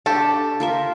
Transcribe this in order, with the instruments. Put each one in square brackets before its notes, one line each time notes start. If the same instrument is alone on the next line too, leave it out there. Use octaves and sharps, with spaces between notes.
[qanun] D4 [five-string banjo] G4 A4
[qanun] F4 A#4 E5